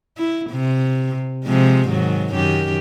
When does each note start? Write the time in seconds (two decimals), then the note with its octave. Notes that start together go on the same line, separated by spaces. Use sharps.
0.17 E4
0.50 C3
1.44 C3 F3 G#3
1.89 G#2 D#3 F#3
2.33 F#2 D#3 G4